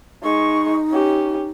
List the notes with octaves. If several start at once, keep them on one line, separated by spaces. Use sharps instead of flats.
G#3 D#4 C#6
C#4 G4